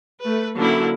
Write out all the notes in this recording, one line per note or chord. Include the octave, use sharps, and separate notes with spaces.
A3 B4
D3 F#3 A#3 C#4 E4